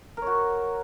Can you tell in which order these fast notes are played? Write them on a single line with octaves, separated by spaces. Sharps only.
A#4 C#5 F#4